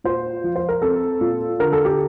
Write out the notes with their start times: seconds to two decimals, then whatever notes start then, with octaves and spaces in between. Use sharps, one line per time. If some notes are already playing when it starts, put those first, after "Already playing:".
0.04 A#2 C5
0.44 F3
0.56 C5
0.69 A#4
0.82 C4 A4
1.21 A#2
1.60 D3 A#4
1.72 A4
1.85 G4